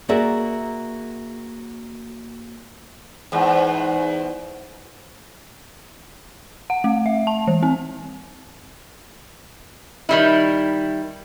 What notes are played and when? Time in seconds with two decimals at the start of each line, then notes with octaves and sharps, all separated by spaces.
0.09 A#3 F#4 G#4 A#4 D5 E5
3.32 E2 G#2
6.70 F#5
6.84 A3
7.06 E5
7.27 A5
7.47 E3
7.63 C4
10.09 D#3 G3 E4